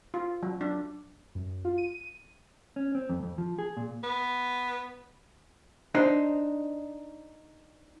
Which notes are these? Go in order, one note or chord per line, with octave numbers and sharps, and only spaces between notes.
F4
F#3
D4
F#2
F4
D#7
C#4
C4
F2
F2
F3
G#4
A#2
B3
D4 D#4 C5